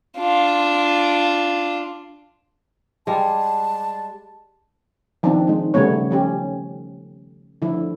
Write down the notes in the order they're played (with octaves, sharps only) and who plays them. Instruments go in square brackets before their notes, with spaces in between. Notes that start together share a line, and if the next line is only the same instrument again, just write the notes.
[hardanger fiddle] D4 F4
[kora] G3 G#3 [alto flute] A5
[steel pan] D#3 F3 B3 C4 D4
G#3 D#4
C#3 G3 A3 B3 C#5
F3 C#4 G4
D3 F3 E4